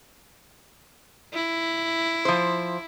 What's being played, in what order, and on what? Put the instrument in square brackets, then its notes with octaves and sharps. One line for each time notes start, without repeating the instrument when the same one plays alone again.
[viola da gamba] E4
[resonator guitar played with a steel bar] F3 C5